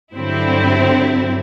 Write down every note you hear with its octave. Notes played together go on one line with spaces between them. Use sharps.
G2 D3 F#3 C4 E4